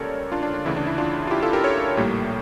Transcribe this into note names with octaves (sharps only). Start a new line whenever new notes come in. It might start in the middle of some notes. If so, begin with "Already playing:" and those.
Already playing: C#2 C#3 G3 A#3 A4 A#4 C#5 D5
D4 F4
D4
D4
D2 C#3 E3 E4
D4
E4
D4 F4
F4
E4 G4
F4 A4
G4 A#4
A4 C#5
A#1 A2 G3 A#3